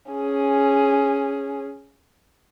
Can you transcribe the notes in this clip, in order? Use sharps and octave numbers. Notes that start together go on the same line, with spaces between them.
C#4 G#4